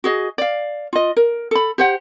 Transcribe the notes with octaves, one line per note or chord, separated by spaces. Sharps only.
F#4 G#4 D#5
D5 F5
F4 D#5
A#4
A4 B5
G4 C5 F#5